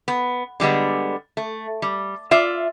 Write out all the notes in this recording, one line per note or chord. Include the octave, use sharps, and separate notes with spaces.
B3
D3 G3 G#3 B3
A3
G3
F4 D5 E5